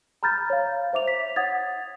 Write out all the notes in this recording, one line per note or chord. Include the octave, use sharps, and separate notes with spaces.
A#5 B5 F6 G6 A6
C#5 F5
C5 E5 D6 F7
B6
C#5 F#5 D#6 G#6 A6